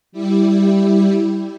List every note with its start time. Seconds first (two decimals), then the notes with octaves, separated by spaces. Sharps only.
0.12 G3 E4 G4